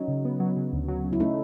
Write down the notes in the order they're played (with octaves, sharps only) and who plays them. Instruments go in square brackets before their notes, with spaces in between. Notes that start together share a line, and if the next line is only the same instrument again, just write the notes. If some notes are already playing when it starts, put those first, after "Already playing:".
Already playing: [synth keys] F#3 [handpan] C#4 D#4
[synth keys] C#3
B3
F#3
C#3
D2
F#3
C#3
[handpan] E4
[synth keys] A3 [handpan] C#4 D#4